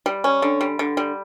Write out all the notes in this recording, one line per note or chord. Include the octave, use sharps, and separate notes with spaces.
G3
C#4
D3
G3
D3
G3